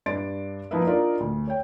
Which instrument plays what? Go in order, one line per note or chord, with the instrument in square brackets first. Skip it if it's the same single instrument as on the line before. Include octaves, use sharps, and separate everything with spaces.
[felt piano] G2 D4 C6 A6 D7
F3 A#3 D#4 E4 B4 E5
D4 D#4 F4 A#4 D5
D2
C#5 G5